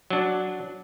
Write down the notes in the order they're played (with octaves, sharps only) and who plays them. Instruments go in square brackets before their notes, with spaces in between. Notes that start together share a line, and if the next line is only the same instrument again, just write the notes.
[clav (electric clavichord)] F#3 D4